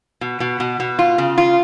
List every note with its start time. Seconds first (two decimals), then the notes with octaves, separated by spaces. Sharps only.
0.21 B2
0.40 B2
0.60 B2
0.80 B2
0.99 F4
1.18 C#3
1.38 F4